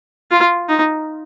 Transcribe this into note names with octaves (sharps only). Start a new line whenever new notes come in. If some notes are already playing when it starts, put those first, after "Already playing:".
F4
D#4